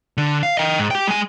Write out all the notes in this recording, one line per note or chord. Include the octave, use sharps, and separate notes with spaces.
D3
F5
D#5 G5
G#2
G4 G5
G#3 G#5